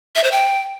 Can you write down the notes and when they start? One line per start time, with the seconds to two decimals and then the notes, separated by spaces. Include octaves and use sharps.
0.16 E5
0.24 C5
0.32 G5